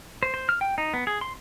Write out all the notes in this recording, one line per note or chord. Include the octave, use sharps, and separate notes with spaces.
C5
C5
F6
G5
D#4
B3
G#4
C6